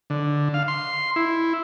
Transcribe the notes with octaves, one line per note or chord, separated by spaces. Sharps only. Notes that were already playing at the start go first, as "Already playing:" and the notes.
D3
F5
C6
E4